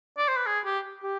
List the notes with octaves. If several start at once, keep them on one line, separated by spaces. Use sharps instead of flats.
D5
C5
B4
G#4
G4
G4